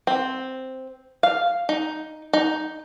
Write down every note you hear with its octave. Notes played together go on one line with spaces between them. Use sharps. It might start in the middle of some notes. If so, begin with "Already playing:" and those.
C4
F5
D#4
D#4